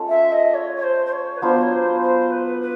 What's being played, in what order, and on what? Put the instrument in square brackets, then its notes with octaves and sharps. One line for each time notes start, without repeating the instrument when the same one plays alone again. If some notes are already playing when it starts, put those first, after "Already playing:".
Already playing: [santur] G#3 C#4 F4 A4
[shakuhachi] E5
D#5
C#5
C#5
C5
C5
C#5
B4
[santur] F#3 B3 D4 F4 [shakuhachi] C5
[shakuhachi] C#5
C5
C5
B4
B4